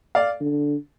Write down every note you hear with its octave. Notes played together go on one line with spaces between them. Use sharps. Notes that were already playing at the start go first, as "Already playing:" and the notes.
D5 F5
D3